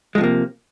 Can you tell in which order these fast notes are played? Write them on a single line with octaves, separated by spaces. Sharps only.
G#3 F3 C3 A#3